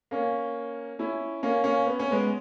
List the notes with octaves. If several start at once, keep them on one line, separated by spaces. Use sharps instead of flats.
A#3 C#4
C#4 E4
A#3 C#4
A#3 C#4
B3
C#4
G#3 B3